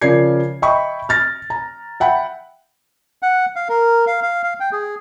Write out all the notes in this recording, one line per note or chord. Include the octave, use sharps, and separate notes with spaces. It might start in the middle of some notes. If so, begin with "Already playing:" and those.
C#3 F3 A#4 D5 G#6 C7
D#5 E5 G5 B5 C#6
F6 A6 A#6
A#5
E5 F#5 G5 B5
F#5
F5
A#4
F5
F5
F5
G5
G#4